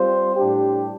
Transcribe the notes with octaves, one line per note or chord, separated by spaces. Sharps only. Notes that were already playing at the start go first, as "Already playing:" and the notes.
Already playing: G3 C4 F4 C5
A2 G3 D4 G4